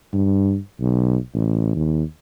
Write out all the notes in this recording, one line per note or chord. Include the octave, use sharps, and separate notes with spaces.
G2
B1
A1
D#2